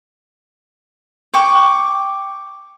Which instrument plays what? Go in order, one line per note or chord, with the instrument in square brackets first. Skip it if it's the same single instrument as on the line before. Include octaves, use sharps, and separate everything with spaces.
[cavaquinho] G5 C#6 D6